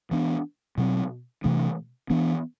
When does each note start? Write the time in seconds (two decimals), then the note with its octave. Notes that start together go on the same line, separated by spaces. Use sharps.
0.11 E3 B3 D4
0.78 B2 F#3 C4
1.44 C3 E3 A3 D4
2.10 E3 B3 D4